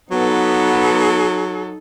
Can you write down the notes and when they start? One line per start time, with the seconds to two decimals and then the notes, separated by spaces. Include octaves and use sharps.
0.11 F#3 B3 D#4 A4